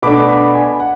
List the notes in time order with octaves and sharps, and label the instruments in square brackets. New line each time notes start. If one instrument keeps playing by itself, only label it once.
[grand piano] B2 A3 D4 B5 D6
B5 D6
G#5 B5
F#5